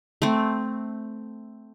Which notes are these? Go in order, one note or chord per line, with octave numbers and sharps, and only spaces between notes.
A3 C4